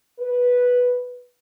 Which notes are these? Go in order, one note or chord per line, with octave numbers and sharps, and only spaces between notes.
B4